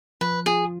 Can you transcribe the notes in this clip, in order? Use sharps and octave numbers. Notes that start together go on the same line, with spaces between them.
F3 B4
F4 G#4